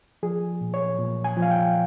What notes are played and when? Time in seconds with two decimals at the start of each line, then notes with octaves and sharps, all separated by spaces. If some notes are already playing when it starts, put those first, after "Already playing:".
0.23 F3 G#4
0.61 A#2
0.74 C#5
0.99 A#2
1.24 G#5
1.37 F3
1.42 F5
1.51 G5